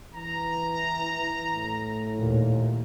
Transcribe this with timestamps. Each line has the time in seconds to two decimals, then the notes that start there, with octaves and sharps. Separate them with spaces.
0.15 E3 A#5
1.55 A2
2.18 D#2 A#2